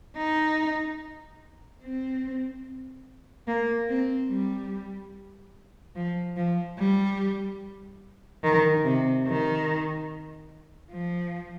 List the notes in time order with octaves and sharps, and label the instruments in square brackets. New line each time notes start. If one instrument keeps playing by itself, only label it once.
[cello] D#4
C4
A#3
C4
G3
F3
F3
G3
D#3
C3
D#3
F3